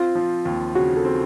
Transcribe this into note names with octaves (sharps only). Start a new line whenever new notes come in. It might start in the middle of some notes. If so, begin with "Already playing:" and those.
Already playing: C4 F4
F3
D#2
C#3 F#4
A4
C4